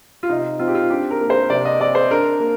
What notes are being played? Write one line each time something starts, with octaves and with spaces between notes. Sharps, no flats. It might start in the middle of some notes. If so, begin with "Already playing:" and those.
F4
C3 D#4
C4 F4
G4
F4
D4 G4
A#4
A#3
C5
C3 D5
D#5
C4 D5
C5
D4 A#4
A#3